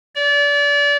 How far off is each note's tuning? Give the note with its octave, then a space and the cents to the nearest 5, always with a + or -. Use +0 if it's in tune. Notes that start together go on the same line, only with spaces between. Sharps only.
D5 -30